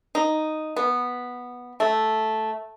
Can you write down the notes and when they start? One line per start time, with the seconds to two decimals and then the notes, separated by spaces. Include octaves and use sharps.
0.15 D#4
0.76 B3
1.80 A3